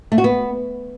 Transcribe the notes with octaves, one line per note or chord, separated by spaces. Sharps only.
A3
F#4
B3